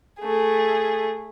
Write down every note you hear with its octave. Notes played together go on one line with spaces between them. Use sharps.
A3 G#4